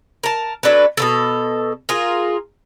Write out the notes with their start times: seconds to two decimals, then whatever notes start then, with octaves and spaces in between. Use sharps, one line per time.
0.23 A#4 A5
0.63 F#3 D4 A4 B4
0.97 B2 E3 A4
1.89 F4 G#4 A#4